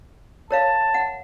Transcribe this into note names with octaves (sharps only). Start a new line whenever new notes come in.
A#4 C#5 F5 A5
F#5